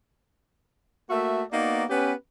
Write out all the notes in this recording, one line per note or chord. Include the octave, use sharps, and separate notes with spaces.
A3 A#3 F#4 E5
A#3 B3 D#4 F#4 D5
B3 C#4 G4 B4